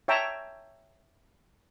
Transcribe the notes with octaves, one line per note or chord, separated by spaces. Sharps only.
C#5 E5 G5 A5 A#5